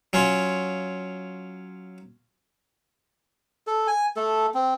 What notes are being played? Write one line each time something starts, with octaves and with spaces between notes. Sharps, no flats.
F#3 C#4 F4
A4
G#5
A3 A4
C4